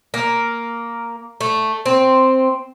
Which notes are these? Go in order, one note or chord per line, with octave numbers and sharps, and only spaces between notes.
A#3
A3
C4